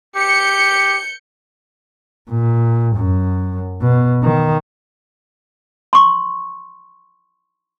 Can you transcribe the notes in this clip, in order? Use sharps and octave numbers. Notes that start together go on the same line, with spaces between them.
G4 G6 C#7
A#2
F#2
B2
D#3
C6 C#6